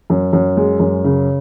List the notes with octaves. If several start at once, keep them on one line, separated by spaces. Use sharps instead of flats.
F#2
F#2
G#3
F#2
C#3